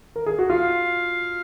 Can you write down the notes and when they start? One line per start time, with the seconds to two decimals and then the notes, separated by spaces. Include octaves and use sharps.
0.16 A#4
0.26 G#4
0.39 F#4
0.50 F4 F5